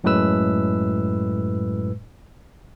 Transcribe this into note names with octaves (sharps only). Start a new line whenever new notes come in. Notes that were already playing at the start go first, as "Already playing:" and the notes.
F#2 A2 F#3 G#3 B4 E6